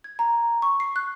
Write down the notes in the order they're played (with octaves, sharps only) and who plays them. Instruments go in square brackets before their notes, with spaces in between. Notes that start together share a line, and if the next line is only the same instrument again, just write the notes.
[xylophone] G#6
A#5
C#6
C7
F#6